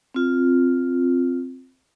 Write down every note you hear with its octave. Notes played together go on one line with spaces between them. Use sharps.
C4 F4